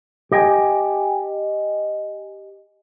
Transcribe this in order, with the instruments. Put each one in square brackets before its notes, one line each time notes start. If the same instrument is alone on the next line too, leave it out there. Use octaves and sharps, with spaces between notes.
[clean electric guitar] G4 D#5 G5 G#5